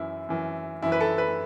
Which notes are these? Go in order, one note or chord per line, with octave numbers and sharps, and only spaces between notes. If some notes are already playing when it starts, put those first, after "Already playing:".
Already playing: F#2 E3 E4
F#2 E3
F#2 E3 E4
B4
A4
B4